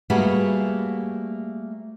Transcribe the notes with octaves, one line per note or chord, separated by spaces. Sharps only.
G3 A3 A#3 F#4 G#4 B4